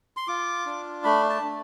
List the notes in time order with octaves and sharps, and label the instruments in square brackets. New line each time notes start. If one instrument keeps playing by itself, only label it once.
[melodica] C6
F4 D6
D4
A3 B5
A5
A3